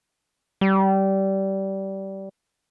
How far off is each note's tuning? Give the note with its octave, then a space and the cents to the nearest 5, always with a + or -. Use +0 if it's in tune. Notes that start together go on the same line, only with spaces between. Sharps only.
G3 -20